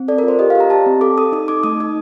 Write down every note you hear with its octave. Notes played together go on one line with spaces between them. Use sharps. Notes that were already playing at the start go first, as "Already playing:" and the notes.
Already playing: C4
A4 D5
A#4
F4
C5
G4 D#5
F5
G4
A#5
G4 A5
C4
A4 D6
A4 D#6
D#4 D#6
D#4 D6
A3 D#6
D#4